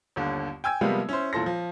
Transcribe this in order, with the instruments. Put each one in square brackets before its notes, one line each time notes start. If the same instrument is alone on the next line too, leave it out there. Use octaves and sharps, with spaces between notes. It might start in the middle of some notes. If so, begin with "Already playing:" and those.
[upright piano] G1 D#2 D3
G5 G#5 E6 G#6
C3 F3 G3 G#3 A#3 B3
C#4 E4 C5
E1 A#2 E3 A4 C6 A#6
F3